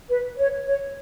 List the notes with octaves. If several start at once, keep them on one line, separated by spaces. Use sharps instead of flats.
B4
C#5
C#5